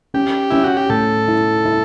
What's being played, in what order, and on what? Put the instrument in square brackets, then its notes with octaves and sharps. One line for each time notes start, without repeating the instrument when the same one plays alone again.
[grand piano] C#4 [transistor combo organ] G4
[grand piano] C#4 [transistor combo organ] E4
[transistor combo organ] F#4
G4
[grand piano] A2 [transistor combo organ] A4
[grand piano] E4
E4